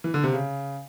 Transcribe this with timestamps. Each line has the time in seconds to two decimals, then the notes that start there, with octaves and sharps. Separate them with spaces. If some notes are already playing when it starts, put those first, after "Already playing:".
0.04 E3
0.14 D3
0.24 C3
0.33 C#3